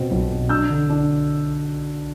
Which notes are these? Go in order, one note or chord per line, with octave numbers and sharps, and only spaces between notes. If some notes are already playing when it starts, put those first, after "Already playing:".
Already playing: B2 C4
B1
B2
D4 E6 G6
D3
D4